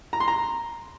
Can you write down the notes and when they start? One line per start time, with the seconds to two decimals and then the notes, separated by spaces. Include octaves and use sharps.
0.13 A#5
0.20 C6
0.28 A#5